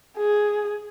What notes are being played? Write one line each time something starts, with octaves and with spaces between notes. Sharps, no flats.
G#4